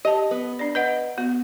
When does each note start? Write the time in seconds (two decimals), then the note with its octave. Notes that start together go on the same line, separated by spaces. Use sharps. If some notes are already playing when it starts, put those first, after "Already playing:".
0.05 G4 D#5 A5
0.31 B3
0.59 D4 D5
0.75 B4 D#5 F#5
1.18 B3 F#4